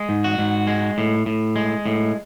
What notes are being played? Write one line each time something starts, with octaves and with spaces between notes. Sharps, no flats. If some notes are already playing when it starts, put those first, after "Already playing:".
Already playing: G#3
G#2
F#4
G#2
G#3
A2
A2
G#3
A2